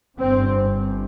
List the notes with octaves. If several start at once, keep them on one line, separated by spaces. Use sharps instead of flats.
G1 G2 C4